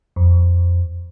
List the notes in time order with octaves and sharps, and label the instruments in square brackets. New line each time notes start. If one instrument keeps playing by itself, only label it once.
[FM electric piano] F2